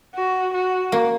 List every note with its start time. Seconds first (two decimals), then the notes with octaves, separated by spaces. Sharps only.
0.15 F#4
0.53 F#4
0.92 A#3